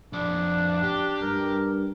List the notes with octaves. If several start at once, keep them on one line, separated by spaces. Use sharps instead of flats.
F2 D4 D5
G4
G2 A#4